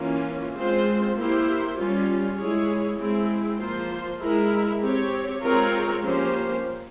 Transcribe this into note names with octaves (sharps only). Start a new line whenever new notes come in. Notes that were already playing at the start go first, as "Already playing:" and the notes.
Already playing: E3 A#3 C#4 F4
G#3 C4 F4 C5
A#3 E4 G4 C5
G3 C#4 F4
G#3 E4 G#4 C#5
G#3 C4 E4 G#4
F3 A#3 F4 C5
G#3 E4 A#4
C4 G4 C#5
G#3 C4 F4 A#4 C#5
F3 A#3 C#4 G4 C5